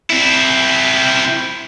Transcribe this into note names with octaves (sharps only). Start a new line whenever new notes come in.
C4 E4